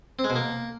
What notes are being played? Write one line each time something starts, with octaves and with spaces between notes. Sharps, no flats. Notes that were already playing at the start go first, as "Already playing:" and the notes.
C4
G#3
B2
A#3